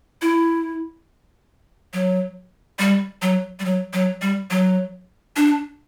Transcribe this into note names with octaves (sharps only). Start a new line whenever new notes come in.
E4
F#3
G3
F#3
G3
F#3
F#3
G3
F#3
D4